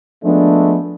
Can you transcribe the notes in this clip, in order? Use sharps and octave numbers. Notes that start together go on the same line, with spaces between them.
F3 G#3 A3 B3 D4